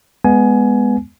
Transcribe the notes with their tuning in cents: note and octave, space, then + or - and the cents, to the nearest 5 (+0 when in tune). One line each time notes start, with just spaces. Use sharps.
G#3 +0 B3 +0 G#5 +20